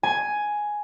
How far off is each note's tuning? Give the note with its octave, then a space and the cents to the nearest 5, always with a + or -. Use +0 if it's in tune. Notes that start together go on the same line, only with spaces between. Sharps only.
G#5 +5